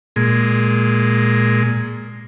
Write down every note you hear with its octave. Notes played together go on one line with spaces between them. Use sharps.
A#2 G#3